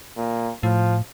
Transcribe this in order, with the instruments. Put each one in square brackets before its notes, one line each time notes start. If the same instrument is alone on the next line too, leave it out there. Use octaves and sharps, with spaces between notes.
[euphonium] A#2
[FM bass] A2 [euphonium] F3